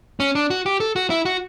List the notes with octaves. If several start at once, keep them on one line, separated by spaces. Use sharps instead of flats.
C#4
D4
F#4
G4
A4
F#4
E4
F#4